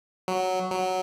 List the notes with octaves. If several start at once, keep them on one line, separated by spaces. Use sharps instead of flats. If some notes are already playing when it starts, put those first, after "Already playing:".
F#3
F#3